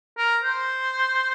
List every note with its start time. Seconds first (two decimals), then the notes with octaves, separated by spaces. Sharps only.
0.18 A#4
0.44 C5